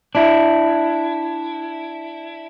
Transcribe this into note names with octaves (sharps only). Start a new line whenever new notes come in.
D4 E4